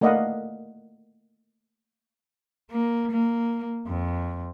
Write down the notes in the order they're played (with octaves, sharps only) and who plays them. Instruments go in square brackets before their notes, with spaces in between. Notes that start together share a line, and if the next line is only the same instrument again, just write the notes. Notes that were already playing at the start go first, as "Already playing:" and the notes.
[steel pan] A3 A#3 D5 D#5 F5 F#5
[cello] A#3
A#3
F2